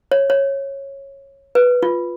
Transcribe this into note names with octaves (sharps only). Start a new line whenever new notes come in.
C#5
C#5
B4
F4